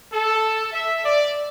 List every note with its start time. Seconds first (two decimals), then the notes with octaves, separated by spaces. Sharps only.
0.13 A4
0.73 E5
1.05 D5